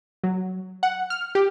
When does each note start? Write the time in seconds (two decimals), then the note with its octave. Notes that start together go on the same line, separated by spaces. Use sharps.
0.24 F#3
0.83 F#5
1.10 F6
1.35 G4